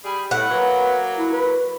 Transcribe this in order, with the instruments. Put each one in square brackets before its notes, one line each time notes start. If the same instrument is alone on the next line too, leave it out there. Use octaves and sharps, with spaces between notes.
[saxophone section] G3 G#4 [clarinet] B5
[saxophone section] A2 [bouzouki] F#5
[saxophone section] F#3 A#3 [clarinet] B4
[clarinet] E4
B4